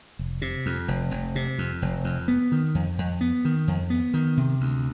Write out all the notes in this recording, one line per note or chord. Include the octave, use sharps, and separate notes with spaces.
F1
C3
F2
F1
F1
C3
F2
F1
F2
B3
D#3
F2
F2
B3
D#3
F2
B3
D#3
C3
D2